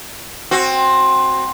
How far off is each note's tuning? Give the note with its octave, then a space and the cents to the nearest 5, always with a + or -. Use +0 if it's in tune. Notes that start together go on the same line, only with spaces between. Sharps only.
C4 +15 F#4 +0